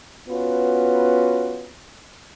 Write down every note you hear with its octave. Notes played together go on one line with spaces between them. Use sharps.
B3 C#4 F4 F#4 B4